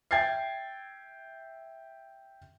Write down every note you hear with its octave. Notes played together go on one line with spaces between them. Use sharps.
E5 G5 G#6 A6 C7